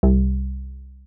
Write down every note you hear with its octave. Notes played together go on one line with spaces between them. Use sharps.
C2